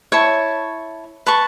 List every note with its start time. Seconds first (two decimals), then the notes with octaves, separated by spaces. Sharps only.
0.12 E4 C#5 A5 C#6
1.27 B4 A5 C#6